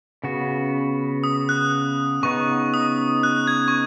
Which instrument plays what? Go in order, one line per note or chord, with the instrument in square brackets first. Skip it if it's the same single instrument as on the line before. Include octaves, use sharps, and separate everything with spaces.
[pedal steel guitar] C#3 B3 F#4
[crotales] D#6
F#6
[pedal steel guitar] C#3 B3 D#4 [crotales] C#6
[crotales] D#6
F#6
G#6
C#6